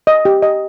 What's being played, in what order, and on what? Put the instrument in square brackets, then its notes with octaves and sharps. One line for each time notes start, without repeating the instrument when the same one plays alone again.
[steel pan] D#5
G4
D#5